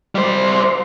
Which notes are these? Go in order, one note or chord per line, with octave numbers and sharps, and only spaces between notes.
G3 C5